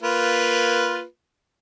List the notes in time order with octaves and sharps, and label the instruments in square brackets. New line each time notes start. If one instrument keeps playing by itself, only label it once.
[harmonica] A#3 F4 B4